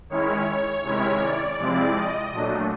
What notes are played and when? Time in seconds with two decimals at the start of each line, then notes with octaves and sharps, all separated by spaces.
0.09 D#3 G#3 C#4 E4 C#5
0.84 C3 D#3 G#3 C#4 E4
1.21 D5
1.59 C3 F3 G#3 C4 E4
1.95 D#5
2.32 A#2 F#3 A3 D4